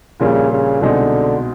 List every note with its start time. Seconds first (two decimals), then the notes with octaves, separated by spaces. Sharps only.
0.20 A#1 A#2 C#3 G3 A#3
0.51 C#3
0.81 C2 B2 D3 G#3 C4 D#4